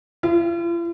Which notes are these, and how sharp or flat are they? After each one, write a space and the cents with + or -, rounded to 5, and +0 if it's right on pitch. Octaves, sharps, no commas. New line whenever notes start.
F4 -45